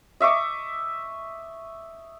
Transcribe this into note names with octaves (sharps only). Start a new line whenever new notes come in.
D#5 E5 C#6 D6